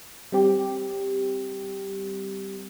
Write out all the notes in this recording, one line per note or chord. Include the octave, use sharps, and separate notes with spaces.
G3 C4 G4